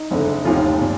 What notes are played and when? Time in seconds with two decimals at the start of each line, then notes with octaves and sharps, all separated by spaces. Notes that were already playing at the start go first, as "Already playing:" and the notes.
Already playing: D#4
0.11 F#1 F2 D3
0.45 F1 D#2 D#3 F4
0.81 A#2